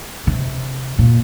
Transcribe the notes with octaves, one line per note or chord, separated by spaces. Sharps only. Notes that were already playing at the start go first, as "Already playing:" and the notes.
C3
A#2